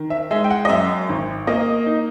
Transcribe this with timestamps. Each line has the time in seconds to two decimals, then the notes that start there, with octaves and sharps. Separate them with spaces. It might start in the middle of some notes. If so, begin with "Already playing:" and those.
Already playing: D#3
0.10 E5
0.31 G#3 E5
0.44 G5
0.50 F#5
0.65 D#5
0.69 F#2 E5
1.09 G#1
1.47 A#3 D#5
1.86 D#4